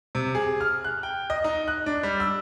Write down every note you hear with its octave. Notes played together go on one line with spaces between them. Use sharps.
C3
G#4
F6
F#6
G5
D#5
D#4
F#6
D4
G3
E6